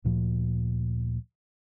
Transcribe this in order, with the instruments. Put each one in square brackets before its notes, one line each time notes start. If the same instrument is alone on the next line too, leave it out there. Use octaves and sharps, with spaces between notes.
[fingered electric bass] D2 A#2 F3